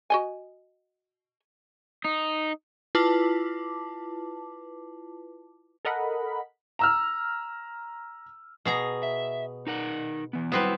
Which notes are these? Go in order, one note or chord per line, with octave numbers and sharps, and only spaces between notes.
F#4 D#5 G#5
D#4
E4 F4 B4 A5 D6
A4 A#4 D#5 F#5 B5
A#5 E6 F6
B2 G#4 A#5
E5
D#4 A#4 F#5
E3 B3
F#3 G3 B3 C4 E4 B4